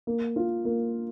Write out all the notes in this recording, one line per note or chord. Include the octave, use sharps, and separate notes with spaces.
A#3
F4
A#3